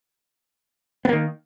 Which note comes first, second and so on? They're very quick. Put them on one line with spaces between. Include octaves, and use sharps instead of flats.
B3 A#3 D#3